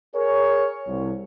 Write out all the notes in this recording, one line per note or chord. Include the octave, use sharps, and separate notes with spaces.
G#4 A#4 C#5
C2